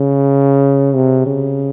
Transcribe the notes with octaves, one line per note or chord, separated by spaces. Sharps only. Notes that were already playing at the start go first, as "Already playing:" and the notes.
Already playing: C#3
C3
C#3